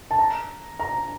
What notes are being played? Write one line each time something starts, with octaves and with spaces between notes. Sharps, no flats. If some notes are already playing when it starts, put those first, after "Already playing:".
A5
A#5
A#5